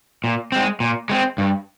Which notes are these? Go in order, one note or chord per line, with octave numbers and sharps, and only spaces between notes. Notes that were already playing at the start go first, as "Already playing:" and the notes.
A#2
G#3 C4
A#2
G#3 C4
G2